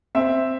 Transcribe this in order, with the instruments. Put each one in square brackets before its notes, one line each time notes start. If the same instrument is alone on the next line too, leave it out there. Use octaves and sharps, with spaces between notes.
[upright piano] C4 E5